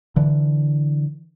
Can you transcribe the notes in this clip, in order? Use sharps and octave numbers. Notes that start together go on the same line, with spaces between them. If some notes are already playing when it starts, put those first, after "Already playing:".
D3 E3